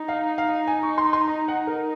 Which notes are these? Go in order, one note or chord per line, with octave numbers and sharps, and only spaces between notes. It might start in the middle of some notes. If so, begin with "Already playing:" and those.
Already playing: D#4
F5
F5
G#5
C#6
C6
C6
A#5
F#5
A#4